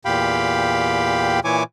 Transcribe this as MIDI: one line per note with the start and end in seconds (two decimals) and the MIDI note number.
0.05 1.40 40
0.05 1.40 46
0.05 1.40 67
0.05 1.40 77
0.05 1.40 79
0.05 1.40 83
1.44 1.63 46
1.44 1.63 52
1.44 1.63 64
1.44 1.63 73
1.44 1.63 80
1.44 1.63 86